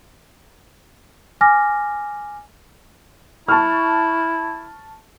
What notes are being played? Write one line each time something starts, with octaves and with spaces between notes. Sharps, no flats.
G#5 D6 F6 A#6
E4 A5 C#6 F6